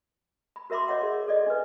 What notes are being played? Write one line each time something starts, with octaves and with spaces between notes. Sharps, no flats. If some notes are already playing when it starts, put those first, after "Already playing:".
B5
F#4 A#4 E5 B5 C6 D6
C#5 D#5 E5 F#5
G#4
A4 D5 D#5
D4 B4